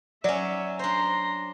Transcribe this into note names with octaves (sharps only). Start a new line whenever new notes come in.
F#3 C#4 D5 E5
D4 C5 A#5 C6